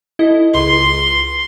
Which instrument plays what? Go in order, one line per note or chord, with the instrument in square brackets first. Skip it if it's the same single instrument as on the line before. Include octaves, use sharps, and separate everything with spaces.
[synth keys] E4 A4 D#5
[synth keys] C#2 [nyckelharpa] C6